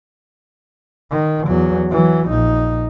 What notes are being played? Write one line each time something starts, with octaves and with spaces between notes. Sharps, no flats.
D#3
E2 F#3
E3 F#3
A#1 D#4